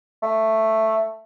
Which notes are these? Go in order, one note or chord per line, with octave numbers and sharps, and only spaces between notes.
A3